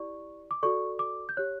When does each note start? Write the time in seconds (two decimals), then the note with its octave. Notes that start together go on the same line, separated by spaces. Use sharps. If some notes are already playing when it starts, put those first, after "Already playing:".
Already playing: E4 G4 D5 C#6
0.51 D6
0.63 F#4 A4 D5 C#6
0.99 D6
1.29 G6
1.37 G4 C#5 F#6